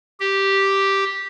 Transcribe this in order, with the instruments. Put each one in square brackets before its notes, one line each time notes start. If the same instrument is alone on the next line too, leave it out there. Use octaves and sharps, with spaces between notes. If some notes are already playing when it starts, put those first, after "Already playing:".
[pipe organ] G4